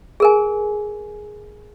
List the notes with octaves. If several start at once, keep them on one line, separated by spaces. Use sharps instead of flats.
G#4 A#4 G#5